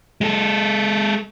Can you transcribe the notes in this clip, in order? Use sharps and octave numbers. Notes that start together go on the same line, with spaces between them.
G#3 A4